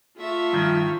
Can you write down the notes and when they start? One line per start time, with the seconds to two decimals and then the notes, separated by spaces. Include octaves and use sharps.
0.18 A3 F4 E5
0.53 G2 D#3 F3